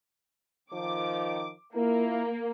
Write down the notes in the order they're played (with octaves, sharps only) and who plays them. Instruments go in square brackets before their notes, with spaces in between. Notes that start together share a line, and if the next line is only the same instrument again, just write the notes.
[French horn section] D#3 F3 [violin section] D6
[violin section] A#3 [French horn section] E4 F4 A#4